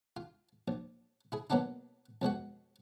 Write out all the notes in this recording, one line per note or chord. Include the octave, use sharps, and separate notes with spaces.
F4
A#1
E4 G#4
B2 F#3 A#3 B3 D4 D#4
F2 B2 G#3 F#4